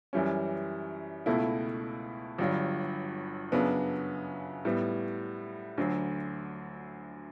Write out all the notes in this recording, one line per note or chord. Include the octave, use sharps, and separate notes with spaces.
F#2 E3 G3 C#4
C#2 B2 A3 E4
G1 G2 F#3
F#2 C#3 F#3 B3 D4
A2 G3 B3
D2 D3 F#3